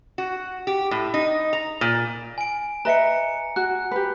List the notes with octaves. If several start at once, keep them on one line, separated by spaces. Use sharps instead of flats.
F#4
G4
A2
D#4
A#5
A#2
G#5 D7
B4 D#5 E5 A#5 C#7
F#4 F#6
G4 B4